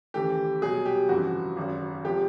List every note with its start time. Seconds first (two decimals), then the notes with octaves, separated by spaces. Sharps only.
0.14 D#2 C#3 E3 A3 G4
0.62 C2 B2 F#3 G#4
0.85 G4
1.09 G1 F2 C#3 E3 F#4
1.57 G#1 F#2 C#3
2.04 C3 F3 G#3 G4